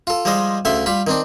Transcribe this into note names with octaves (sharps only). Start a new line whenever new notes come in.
F4 A4
F3 G3 G#3 C5 D#5
D2 C#3 E5 C6
G3 F4 B5
D#3 C4 D4